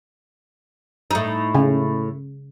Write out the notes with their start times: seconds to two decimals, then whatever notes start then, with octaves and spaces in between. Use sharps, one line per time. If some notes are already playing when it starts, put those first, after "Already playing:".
1.11 A2 D#4
1.55 C#3